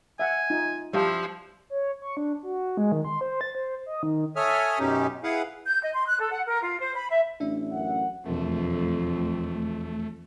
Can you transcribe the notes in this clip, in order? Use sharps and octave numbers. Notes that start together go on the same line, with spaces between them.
E5 F#5 G#5
D#4 F4
F3 G3 E4 G4 F5
C#5
C#6
D4
F#4
G#3
D#3
C6
C5
A6
C5
D#5
D#3
A4 C#5 E5 G#5 D#6 F6
F#2 B2 C#4 D#4 G4
E4 G#4 B4 F5 F#5
G6
D#5
C6
F#6
A4
F#5
A#4
F4
C5
B5
E5
A1 D4 E5
F#2 F#5
E1 F2 A3 A#4